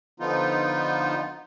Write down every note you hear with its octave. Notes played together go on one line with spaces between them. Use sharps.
D3 F3 B3 D#4 F4